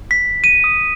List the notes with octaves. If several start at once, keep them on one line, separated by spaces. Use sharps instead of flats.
B6
D#7
D#6